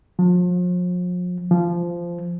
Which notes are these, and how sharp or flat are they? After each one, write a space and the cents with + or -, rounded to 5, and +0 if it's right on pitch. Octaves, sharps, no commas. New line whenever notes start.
F3 +40
F3 -15